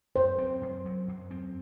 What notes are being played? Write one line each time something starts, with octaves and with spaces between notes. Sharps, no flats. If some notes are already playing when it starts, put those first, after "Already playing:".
F#2 C5
C4
F#2
F#3
F#2
C4